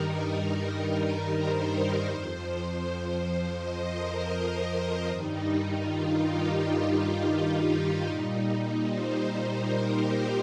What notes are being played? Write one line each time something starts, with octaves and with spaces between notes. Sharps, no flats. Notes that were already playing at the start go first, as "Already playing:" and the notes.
Already playing: G2 D#3 G3 D#4 A#4
C5
F2 F3
D#5
A#4
G2 D#3 G3 D#4
F4
G4
F4
D#4
A#2 G3
C5
A#4
G4